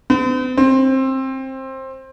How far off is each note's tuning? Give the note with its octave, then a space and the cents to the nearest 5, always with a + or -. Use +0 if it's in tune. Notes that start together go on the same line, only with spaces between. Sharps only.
C4 -45
C4 +20